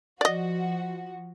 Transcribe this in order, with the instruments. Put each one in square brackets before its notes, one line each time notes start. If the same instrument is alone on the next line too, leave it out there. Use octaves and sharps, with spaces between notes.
[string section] F3 F#4 [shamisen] D5 D#5